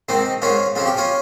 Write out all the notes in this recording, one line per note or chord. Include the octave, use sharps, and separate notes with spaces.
G#2 D#3 C4 D#4
G#2 D#3 C#4 F4
F2 C#3 F3 F4
G4
C#4 F4